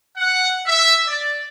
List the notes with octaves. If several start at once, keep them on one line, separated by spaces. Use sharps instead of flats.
F#5
E5
D5